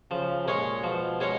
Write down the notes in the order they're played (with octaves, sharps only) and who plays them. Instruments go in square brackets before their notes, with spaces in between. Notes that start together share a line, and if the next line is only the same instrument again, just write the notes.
[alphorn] C#3 [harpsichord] F3
[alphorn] A#2 [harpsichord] G#3 C#4 G#4 C#5
[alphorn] B2 [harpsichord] F3
[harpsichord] G#3 C#4 G#4 C#5